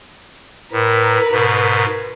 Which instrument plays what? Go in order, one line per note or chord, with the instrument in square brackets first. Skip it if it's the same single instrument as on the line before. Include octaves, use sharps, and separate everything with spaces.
[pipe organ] A2 [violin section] A#4 B4
[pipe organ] G#2 B2